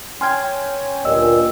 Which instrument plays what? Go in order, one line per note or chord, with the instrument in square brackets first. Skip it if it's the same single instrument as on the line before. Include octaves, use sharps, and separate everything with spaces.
[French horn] C#4 [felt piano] G5 G#5 [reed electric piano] C6 F6 G#6
[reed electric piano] D2 D#5 E6 [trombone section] G2 A#2